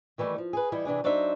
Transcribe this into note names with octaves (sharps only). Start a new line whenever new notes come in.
D#3 E3 G3 A3
F3
G#4 B4
E3 G3 E4 D#5
C3 E3 D4 G#4
F#3 D4 D#4 C5 E5